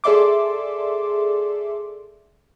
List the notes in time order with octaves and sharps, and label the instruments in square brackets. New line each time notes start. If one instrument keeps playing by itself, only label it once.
[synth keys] G#4 A4 D5 E5 C6 D6